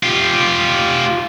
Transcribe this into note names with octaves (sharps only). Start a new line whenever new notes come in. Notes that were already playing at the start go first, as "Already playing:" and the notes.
F4 G4